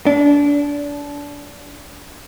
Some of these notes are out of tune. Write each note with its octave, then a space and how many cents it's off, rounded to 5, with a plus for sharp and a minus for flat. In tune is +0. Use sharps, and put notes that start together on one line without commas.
D4 -25